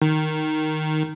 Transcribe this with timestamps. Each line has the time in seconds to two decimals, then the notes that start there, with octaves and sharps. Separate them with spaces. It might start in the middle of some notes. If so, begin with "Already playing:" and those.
0.02 D#3